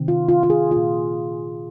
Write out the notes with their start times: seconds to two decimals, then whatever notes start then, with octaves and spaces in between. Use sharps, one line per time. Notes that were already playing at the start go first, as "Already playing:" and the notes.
Already playing: C3 D#3 C4
0.08 F4
0.28 F4
0.43 F4
0.50 G#4
0.71 A#2 A#3 F4